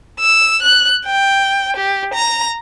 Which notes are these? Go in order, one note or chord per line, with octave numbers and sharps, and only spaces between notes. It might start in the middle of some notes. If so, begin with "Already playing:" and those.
E6
F#6
G5
G4
A#5